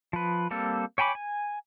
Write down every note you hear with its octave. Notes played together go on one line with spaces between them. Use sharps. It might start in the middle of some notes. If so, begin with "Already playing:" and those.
F3 B4
G3 A#3 C4 A4
C#5 G5 G#5 B5 D6
G#5